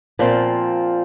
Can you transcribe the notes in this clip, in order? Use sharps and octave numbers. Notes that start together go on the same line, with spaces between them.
A#2 F3 C4